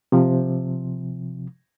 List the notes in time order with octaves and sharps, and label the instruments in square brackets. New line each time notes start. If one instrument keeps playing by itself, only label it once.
[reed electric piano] C3 F3